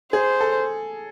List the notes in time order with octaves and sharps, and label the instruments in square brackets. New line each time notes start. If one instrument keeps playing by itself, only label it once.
[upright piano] G#4 [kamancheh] C5
[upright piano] A4